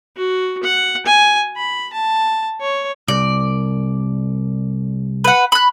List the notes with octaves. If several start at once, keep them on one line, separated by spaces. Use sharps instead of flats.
F#4
F#5
G#5
B5
A5
C#5
C2 D5
B4 F#5
B5 F#6